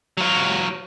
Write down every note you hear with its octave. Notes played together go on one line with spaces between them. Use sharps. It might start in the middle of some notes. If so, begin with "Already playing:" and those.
F#3 F4